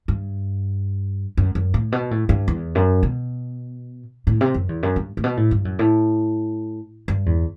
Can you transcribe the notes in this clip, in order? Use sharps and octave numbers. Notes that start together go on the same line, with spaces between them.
G2
F#2
F#2
A2
B2
A2
G2
E2
F#2
B2
A2
C3
F#2
E2
F#2
G2
A2
B2
A2
G2
F#2
A2
G2
E2